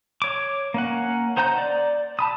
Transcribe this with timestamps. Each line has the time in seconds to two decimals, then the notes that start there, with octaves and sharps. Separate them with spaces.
0.22 C#5 D6
0.74 A#3 C#4 F#5
1.37 D#4 C5 F#5 A#5 G6
1.58 D5
2.19 A5 B5 D#6